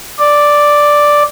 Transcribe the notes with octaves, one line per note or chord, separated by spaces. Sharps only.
D5